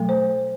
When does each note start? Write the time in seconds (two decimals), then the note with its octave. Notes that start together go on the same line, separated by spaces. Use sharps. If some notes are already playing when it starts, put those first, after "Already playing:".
Already playing: B2 F#3 A3
0.09 C5